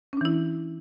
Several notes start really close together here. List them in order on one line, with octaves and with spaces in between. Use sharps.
C#4 D4 E3 E4